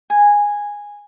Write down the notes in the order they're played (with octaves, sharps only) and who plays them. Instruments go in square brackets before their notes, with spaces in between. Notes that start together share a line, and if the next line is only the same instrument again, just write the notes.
[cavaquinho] G#5